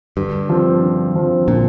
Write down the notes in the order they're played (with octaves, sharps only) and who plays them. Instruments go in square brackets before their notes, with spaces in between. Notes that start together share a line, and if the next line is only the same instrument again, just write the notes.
[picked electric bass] G2 [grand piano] D3
[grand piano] F3 C4 F4
D3
F3 C4 F4
[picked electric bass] A#2 [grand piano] D3